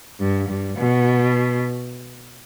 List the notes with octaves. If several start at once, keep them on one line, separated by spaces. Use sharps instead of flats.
G2
G2
B2